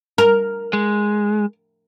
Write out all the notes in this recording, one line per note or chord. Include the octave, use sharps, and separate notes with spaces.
A#4
G#3